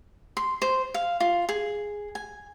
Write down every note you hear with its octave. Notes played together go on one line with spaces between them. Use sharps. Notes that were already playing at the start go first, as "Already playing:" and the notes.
C6
C5
F5
F4
G#4
G#5